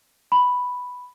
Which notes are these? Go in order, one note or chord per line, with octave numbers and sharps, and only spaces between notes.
B5